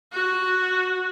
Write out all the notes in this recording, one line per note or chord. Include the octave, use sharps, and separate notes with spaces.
F#4